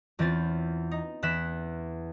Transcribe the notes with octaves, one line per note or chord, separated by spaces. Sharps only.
E2 E3 C4 C#4 F4 A6
D#4
E2 E3 F#6 B6 E7